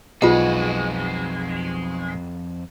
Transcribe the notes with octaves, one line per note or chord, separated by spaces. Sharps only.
B1 F2 G#3 B3 F4 F#4 F#5